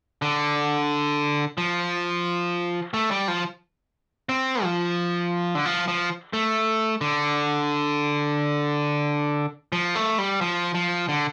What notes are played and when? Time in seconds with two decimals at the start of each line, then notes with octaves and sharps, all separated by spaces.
0.22 D3
1.58 F3
2.94 A3
3.11 G3
3.28 F3
4.29 C4
4.63 F3
5.55 D3
5.65 F3
5.88 F3
6.33 A3
7.01 D3
9.72 F3
9.95 A3
10.18 G3
10.41 F3
10.74 F3
11.09 D3